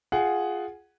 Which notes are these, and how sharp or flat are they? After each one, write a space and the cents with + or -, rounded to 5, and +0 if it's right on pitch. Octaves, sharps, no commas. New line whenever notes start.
F4 +0 G#4 +0 F#5 +10